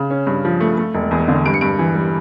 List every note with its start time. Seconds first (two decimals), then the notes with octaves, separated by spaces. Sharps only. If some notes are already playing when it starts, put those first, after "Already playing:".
Already playing: C#3
0.10 C#4
0.27 G2
0.45 F3
0.60 A3
0.78 A3
0.94 E1
1.11 E2
1.28 D3
1.46 G2 D7
1.54 C#7
1.61 G2 D7
1.79 E3
1.95 G3